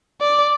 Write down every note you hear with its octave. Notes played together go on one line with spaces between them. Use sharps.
D5